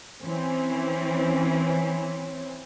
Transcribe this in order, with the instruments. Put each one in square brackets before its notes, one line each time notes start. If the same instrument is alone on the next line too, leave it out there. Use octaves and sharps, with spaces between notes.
[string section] E3 C4 C#4